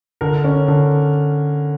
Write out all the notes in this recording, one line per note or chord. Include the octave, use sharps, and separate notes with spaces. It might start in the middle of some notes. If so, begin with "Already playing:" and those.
D3 A#4
C#4
D3